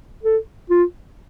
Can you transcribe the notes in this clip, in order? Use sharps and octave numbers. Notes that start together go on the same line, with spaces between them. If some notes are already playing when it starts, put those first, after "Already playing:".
A4
F4